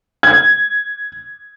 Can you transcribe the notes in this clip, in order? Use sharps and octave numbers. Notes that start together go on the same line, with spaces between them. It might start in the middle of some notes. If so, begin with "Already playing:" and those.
G#6